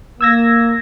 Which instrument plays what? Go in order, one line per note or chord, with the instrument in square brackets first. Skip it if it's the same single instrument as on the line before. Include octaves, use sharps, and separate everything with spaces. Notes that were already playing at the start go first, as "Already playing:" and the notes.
[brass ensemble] A#3 [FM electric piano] E6 G#6 A#6